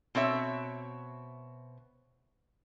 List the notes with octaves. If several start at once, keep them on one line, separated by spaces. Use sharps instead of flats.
B2 C4 C#5 E5